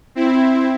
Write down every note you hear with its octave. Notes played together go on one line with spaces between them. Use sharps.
C4 E4